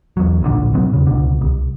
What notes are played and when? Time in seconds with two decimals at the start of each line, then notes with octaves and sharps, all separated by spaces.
0.17 E2 F#3
0.41 D1 A#1 A#2 D3
0.74 B2 F#3 C4
0.93 E2 C#3
1.07 C#2 B2 D3
1.41 C2